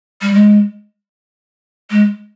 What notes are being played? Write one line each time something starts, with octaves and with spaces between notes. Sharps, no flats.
G3
G#3
G#3